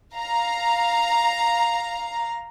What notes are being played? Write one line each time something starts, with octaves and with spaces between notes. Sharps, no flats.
F5 A#5